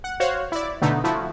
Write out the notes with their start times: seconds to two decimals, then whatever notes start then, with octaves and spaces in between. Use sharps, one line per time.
0.04 F#5
0.20 F#4 C5 C#5 F5 F#5
0.52 E4 D5
0.82 B2 D3 A3 B3 D#4
1.04 F3 A3 E4 F#4